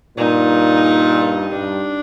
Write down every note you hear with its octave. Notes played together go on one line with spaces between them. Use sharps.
G2 A#2 D#4
G2 D4